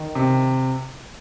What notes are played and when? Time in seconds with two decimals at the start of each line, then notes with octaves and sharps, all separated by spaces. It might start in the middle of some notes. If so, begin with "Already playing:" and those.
Already playing: D#3
0.15 C3